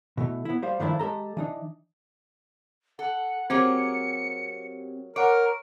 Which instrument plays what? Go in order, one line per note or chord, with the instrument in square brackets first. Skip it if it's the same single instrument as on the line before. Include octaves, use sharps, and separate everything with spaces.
[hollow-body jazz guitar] B2 E3 A3
B3 E4
G3 C5 F5
G2 D#3 F3 A3 D4 E4
G#3 G4 A4 A#5
E3 D4 D#4
[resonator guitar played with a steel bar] A4 [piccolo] F#5
[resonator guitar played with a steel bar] F#3 A#3 G#4 [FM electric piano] C4 G4 [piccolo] C#7
[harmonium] A#4 [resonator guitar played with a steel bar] C#5 [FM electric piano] F#5 D6 [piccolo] D7